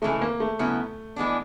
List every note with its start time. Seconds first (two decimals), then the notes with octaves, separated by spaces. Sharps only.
0.02 C#3 E3 G#3 A3
0.21 A#3
0.40 A3
0.59 C#3 F#3 B3 E4
1.16 E3 G#3 B3 D4